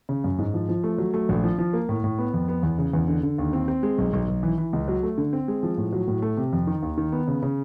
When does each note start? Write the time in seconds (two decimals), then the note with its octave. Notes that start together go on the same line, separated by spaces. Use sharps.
0.09 C#3
0.24 F#2
0.38 G#2
0.54 F3
0.69 F3
0.84 A3
0.98 F#3
1.14 A3
1.29 A#1
1.44 F3
1.59 F3
1.73 A#3
1.89 A2
2.04 A2
2.18 B3
2.34 F2
2.48 B3
2.63 E2
2.78 C#3
2.93 E2
3.08 D3
3.23 D3
3.38 D#2
3.53 C4
3.68 C4
3.83 G#3
3.98 B1
4.13 B1
4.28 B1
4.43 E3
4.58 E3
4.73 C#2
4.88 F#3
5.03 A3
5.18 D3
5.33 C4
5.48 G#3
5.63 F3
5.77 A2
5.93 F#3
6.08 A2
6.22 A3
6.37 C3
6.53 F2
6.67 D#3
6.83 D#2
6.98 D#3
7.12 B3
7.28 C#3
7.43 C#3